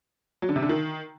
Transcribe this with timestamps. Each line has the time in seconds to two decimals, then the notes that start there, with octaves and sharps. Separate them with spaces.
0.42 F#3
0.49 D3
0.56 C3
0.63 D3
0.69 D#3